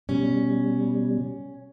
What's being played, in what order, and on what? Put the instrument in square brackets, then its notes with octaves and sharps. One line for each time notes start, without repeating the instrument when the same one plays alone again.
[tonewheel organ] B2 G3 [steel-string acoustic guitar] C#4